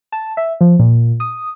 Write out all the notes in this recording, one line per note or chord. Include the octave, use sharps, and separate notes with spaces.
A5
E5
F3
A#2
D#6